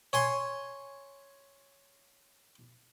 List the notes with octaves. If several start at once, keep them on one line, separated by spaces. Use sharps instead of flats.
C#5 G#5 C6